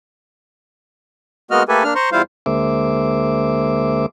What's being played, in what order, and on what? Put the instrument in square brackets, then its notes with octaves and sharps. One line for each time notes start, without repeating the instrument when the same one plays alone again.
[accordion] G#3 A#3 B3 F#4 D#5 F6
A3 A#3 G4 A4 B4 G#5
A#3 D4 F6
C5 A#5 C6 C#6
E2 G3 E4 F4 C5 F5
[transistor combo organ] D2 G#3 A#3 C5 E5 D6